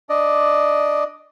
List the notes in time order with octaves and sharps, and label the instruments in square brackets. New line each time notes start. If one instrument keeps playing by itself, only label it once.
[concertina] D4 D5 D#5